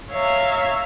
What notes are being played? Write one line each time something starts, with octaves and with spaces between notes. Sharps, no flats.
C#5 E5 F5 A#5